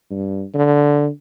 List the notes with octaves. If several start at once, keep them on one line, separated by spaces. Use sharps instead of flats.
G2
D3